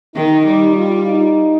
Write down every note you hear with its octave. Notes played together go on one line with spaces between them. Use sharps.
D#3 D#4
G3
F4
D#4